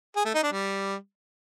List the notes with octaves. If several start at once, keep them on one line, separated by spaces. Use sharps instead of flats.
G#4
A3
D#4
D4
G3